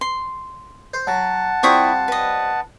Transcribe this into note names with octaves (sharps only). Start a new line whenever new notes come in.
C6
C5
F#3 F#5 A5
G3 C4 E4 F4 C#6 D#6
B4 D#5